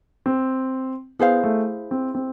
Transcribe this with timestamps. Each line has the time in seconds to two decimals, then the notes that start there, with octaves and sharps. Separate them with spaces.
0.26 C4
1.19 B3 E4 G#4 C5 F5
1.43 A3
1.91 C4
2.15 C4